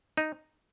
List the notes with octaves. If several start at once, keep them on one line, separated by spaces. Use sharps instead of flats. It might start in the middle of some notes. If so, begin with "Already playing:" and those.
D#4